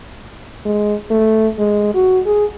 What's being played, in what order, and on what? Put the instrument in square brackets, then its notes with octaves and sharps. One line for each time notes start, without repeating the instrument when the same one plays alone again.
[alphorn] G#3
A3
G#3
F#4
G#4